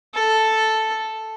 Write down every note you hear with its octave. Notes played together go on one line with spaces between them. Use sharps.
A4